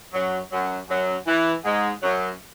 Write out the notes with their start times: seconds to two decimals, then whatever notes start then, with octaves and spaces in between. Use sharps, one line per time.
0.13 F#2 F#3
0.51 F#2 F#3
0.89 F#2 F#3
1.27 E3
1.64 G#2 G#3
2.03 F#2 F#3